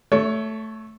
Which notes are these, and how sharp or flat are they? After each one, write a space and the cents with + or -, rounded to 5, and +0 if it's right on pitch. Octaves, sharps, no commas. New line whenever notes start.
A3 +0 C#5 +20